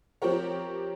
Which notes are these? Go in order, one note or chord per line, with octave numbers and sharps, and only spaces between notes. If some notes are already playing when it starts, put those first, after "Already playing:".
F3 C4 G4 A#4 C#5